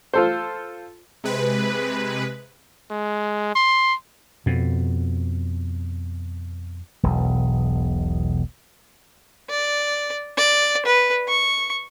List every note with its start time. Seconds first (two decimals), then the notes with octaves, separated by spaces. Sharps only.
0.14 F4 A4 C5
1.24 C3 G#3 B4
2.91 G#3
3.55 C6
4.46 F2 B2
7.03 E1 B1
9.50 D5
10.37 D5
10.86 B4
11.28 C#6